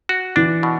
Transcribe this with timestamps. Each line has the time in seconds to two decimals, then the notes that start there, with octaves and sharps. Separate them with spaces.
0.09 F#4
0.36 E3 D4
0.63 B2